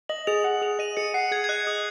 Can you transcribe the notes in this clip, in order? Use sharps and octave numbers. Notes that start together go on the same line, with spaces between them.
D#5 F#7
G#4 F7
F#5 F7
G#4 F7
D#5 D#7
G#4 C#7
F#5 C7
G#4 G#6
G#6
D#5 F#6
G#4 D#6